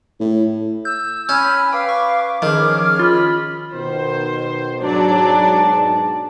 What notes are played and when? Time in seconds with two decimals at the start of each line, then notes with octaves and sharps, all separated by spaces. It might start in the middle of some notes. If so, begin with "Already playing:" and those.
0.20 A2
0.85 E6 G6
1.29 C#4 G#5 B5 F6
1.73 B4 F5 G5 D6
1.89 C#6
2.42 D#3 F3 C#4 G#4 F6
2.99 F4 B5
3.74 B2 D#3 C5
4.83 G#2 B2 F#3 D4 D5 A5